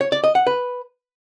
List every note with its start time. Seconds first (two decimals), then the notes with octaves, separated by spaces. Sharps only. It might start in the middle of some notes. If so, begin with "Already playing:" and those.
0.01 C#5
0.12 D5
0.24 D#5
0.35 F#5
0.47 B4